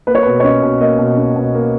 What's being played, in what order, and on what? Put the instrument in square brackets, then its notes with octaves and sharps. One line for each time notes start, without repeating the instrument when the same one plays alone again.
[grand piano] A#3 B4
C#5
B2 B4
C#5
C#4 D#5
B2
A#3 D#5
B2
C#4
B2
A#3